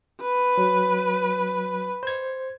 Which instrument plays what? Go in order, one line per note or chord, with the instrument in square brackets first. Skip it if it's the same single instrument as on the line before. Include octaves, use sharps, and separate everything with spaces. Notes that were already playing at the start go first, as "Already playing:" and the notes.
[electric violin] B4
[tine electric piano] F#3
C5 G#6